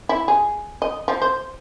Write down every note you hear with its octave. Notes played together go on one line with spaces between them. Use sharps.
E4
G#4
D#5
F3
C5